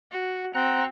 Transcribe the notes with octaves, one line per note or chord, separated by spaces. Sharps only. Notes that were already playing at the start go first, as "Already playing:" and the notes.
F#4
C4 F#5 A#5 F#6